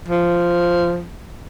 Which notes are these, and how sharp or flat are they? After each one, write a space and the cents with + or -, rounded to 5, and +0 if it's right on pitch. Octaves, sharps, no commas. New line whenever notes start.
F3 -10